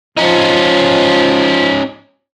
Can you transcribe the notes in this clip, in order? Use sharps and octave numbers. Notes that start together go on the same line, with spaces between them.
F3 C#4 D#4